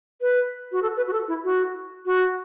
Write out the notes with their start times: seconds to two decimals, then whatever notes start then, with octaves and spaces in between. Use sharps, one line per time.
0.21 B4
0.72 F#4
0.82 A4
0.97 B4
1.07 F#4
1.13 A4
1.28 E4
1.44 F#4
2.06 F#4